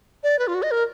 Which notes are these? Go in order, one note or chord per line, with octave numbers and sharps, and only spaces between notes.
D5
B4
F4
F#4
D#5
A#4